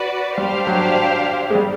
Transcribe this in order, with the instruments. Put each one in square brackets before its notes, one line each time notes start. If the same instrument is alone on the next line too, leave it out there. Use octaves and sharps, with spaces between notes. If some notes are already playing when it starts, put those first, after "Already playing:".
Already playing: [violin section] F#4 B4 D5
[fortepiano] G3 [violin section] D4 G4 C5 F5
[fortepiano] F#3
G#3
G3